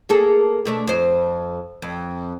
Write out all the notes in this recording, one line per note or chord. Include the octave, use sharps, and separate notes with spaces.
A#3 G#4 A4
B2 A3 D4
F2 C5
F2